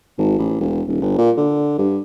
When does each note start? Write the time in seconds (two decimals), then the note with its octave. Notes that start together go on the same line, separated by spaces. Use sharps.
0.18 G#1
0.38 A1
0.60 E1
0.88 D#1
1.01 G1
1.18 A#2
1.37 D3
1.78 G2